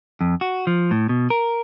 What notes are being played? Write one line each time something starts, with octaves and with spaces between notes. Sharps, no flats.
F2
F#4
F3
A2
B2
A#4